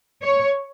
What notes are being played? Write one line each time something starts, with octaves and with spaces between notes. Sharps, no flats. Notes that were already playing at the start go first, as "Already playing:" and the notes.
C#5